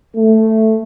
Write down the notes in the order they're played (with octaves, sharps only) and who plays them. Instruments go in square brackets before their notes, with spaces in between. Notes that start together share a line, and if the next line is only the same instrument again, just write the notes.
[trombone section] A3